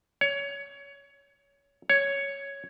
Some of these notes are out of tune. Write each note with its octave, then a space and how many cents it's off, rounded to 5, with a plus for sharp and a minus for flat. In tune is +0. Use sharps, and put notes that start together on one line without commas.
C#5 +20
C#5 +5